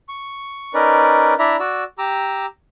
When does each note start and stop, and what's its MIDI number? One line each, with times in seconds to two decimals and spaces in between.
0.09 0.73 85
0.74 1.34 61
0.74 1.34 63
0.74 1.34 70
0.74 1.34 71
0.74 1.34 74
1.39 1.57 62
1.39 1.57 64
1.39 1.57 74
1.39 1.57 76
1.39 1.57 82
1.39 1.57 83
1.60 1.84 66
1.60 1.84 74
1.60 1.84 88
1.98 2.46 67
1.98 2.46 82
1.98 2.46 86
1.98 2.46 88